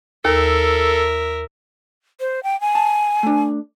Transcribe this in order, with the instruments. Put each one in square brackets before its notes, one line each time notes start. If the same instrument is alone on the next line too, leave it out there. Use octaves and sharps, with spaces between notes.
[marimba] D#2 [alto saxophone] A4 [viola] A#4 E5
[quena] C5
G5
G#5
[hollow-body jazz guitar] A5
A3 D4